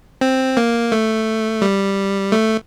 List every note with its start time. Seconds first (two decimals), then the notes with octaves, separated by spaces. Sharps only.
0.21 C4
0.57 A#3
0.92 A3
1.62 G3
2.32 A3